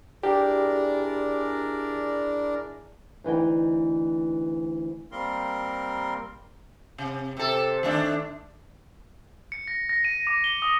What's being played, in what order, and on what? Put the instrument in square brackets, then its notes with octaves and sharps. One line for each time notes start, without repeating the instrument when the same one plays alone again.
[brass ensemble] G#3 E4 G#4 [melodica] D4 A#4 D5 [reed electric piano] G4
[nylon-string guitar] D2 E3 D#4 G5
[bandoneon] G3 A#3 C4 A#4 C6
[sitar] C3
C3 A4
D#3 A3 D4
[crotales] C#7
A#6
A#6
D#7
D6
G7
D#6